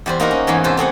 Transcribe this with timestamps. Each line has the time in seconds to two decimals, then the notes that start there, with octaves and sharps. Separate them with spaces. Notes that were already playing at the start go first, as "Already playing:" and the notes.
0.06 E2 G3 C5
0.20 A#3 D#4 F#4 A#4
0.31 C#4
0.47 E2 G#2 E3 G#3
0.64 C3 B4 C5 A5
0.77 A3 C4 G#4 F#5